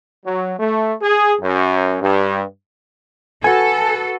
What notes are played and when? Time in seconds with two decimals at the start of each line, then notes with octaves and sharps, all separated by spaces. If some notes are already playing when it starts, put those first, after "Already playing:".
0.25 F#3
0.59 A3
1.02 G#4
1.41 F#2
2.01 G2
3.44 F#4 A4 B4 G#5